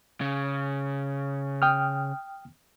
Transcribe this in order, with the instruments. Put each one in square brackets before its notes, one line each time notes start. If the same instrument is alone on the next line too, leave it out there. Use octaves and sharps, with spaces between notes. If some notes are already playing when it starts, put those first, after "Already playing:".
[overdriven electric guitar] C#3
[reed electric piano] G5 D#6 F6